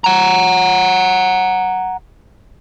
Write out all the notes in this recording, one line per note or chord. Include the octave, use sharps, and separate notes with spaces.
F#5 A#5